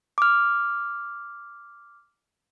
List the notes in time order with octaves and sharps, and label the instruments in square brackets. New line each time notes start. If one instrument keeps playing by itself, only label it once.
[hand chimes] D6 F6